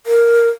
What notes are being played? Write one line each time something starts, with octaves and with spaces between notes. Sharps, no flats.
A#4